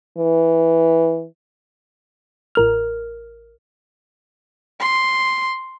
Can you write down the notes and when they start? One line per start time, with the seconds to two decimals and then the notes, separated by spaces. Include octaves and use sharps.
0.18 E3
2.55 A1 A#4 F6
4.80 C6